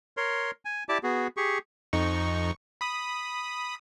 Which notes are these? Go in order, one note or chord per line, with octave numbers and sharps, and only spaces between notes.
A#4 C#5 C6
G#5
E4 G4 D5 A5 D6
B3 F#4 G#4
G4 G#4 C#6
F2 D#4 C#6
B5 D#6